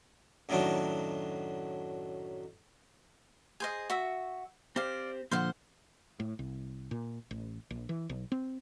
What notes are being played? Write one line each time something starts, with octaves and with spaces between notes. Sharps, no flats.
F#2 A2 D#3 F#3 D4
G#4 C5 D#5
F#4 E5
C4 G4 C5 D5 F5
A#2 D3 F3 C5 F5 F#5
A2
C2
A#2
A1
A#1
E3
B1
C4